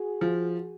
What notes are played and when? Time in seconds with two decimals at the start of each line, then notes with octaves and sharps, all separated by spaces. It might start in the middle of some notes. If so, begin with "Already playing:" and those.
Already playing: F#4 G#4
0.21 F3